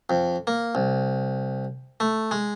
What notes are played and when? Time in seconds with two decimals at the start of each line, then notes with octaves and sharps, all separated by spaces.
0.10 F2
0.47 A#3
0.75 C2
2.00 A3
2.31 G#3